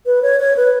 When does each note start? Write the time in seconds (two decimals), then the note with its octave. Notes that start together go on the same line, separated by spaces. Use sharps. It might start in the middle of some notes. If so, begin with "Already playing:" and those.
0.06 B4
0.23 C#5
0.40 C#5
0.56 B4